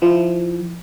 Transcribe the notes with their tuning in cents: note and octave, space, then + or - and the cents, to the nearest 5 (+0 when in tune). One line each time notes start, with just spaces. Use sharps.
F3 -10 E4 +0